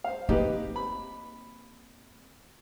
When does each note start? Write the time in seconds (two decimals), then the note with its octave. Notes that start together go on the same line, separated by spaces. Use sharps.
0.04 C5 F5
0.29 A#3 C4 D#4 G4 B4
0.76 B5